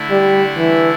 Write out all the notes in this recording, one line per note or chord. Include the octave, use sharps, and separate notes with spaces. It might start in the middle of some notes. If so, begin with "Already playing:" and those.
Already playing: D3 A3 E4
G3
E3